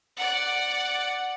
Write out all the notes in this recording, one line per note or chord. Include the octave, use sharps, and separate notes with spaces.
D5 F#5